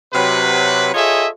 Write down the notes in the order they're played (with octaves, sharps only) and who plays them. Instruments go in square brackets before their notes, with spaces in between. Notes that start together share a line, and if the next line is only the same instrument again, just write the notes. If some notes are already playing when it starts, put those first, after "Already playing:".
[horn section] C3 F#3 B4
F4 G#4 A4 C#5 D#5 E5